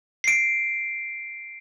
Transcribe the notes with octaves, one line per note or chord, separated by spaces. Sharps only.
C7 D7